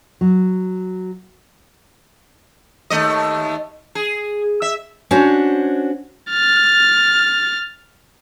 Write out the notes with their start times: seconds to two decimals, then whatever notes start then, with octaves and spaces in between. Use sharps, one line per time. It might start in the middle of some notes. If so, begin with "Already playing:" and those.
0.21 F#3
2.90 D#2 A3 D#5
3.95 G#4
4.62 E5
5.11 C#4 D4 F#4 C5 C#5
6.31 F6 A6